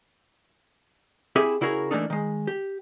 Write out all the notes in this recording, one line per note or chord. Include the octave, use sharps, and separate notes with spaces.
C4 E4 G4 G#4 E5 G#5
C#3 E4 F#4 G#4 A#4
E3 F#3 A3 A#3 D4 D#4
D#3 G#3
G4